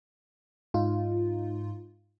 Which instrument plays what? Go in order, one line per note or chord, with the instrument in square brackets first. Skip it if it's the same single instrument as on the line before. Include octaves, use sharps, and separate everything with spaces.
[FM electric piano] G#2 D#4 F4